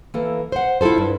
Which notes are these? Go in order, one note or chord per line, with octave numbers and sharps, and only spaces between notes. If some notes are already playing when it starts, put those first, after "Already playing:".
E3 A#3 A4
C5 F#5
E4 F4 G#4 A4 C5
G2